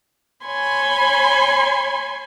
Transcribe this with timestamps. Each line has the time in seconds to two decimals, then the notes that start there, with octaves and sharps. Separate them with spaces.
0.45 C#5 G#5 B5 C6